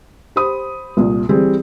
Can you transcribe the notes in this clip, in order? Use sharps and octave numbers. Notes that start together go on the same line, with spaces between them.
G4 C5 B5 D#6
C2 A#2
E3 G3 C4 G#4